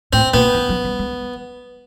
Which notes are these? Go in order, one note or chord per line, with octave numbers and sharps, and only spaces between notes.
A2 C4
A#2 B3
E3
F#3
G3
G#3